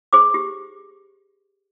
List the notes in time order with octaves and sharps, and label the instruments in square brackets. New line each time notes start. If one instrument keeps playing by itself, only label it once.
[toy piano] G#4 C5 D6
G4